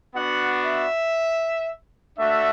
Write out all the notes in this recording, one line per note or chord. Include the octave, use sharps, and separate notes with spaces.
B3 D4 F#4 F#5
E5
A3 D4 F#4 E5